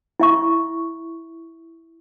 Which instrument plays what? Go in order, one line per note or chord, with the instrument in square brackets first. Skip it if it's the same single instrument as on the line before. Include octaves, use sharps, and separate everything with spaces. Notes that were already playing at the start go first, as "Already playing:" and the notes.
[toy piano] E4 E5 C#6